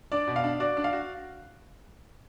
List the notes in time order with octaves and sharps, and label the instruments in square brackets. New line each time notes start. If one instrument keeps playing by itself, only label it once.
[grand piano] D4 [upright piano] D5
[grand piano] B2
[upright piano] F5
[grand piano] D4
[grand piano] F#4 [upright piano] D5
[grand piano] D4
[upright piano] F5
[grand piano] F#4